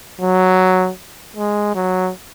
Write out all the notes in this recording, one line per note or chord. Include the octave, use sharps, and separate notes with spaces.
F#3
G#3
F#3